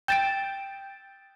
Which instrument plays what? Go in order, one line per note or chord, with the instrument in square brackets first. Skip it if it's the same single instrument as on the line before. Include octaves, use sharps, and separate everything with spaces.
[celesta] G5 E7 [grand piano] G6 A6 D7